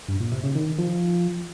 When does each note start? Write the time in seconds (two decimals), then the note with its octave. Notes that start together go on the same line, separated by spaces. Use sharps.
0.08 G2
0.20 A#2
0.32 C3
0.43 C#3
0.55 D#3
0.78 F3